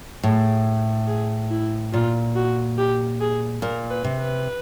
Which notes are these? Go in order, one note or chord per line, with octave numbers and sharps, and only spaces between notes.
A2 G#4
G#4
E4
A#2 F4
F#4
G4
G#4
A#2 A#4
B4
C3
B4